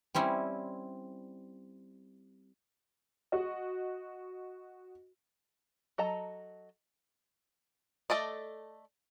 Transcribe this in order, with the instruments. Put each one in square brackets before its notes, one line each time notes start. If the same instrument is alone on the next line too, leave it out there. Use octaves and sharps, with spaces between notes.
[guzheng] G3 C4 C#4 E4
[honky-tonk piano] F#4 D#5
[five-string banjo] F#3 A4 D#5 A5 A#5
A3 A4 D5 D#5